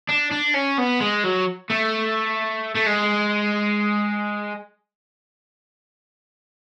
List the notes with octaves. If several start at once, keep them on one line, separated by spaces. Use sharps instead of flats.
D4
D4
C#4
B3
G#3
F#3
A3
A3
G#3